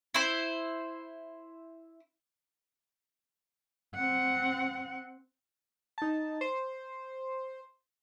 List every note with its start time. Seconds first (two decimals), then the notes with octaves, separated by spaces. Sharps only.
0.14 E4 C5
3.95 C4 F#5
5.98 D#4 A5
6.41 C5